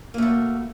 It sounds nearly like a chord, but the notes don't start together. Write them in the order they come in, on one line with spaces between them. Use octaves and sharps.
A#3 A3 B2